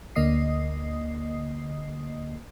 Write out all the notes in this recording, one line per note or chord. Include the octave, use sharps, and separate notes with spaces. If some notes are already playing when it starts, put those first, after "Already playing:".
D2 D3 A#3 D#5 D#6 C7